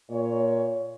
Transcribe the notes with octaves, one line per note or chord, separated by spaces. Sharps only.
A#2 C#5